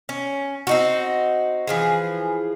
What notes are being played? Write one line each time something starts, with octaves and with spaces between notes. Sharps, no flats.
C#4
C4 D#4 F#4
E3 F3 G#4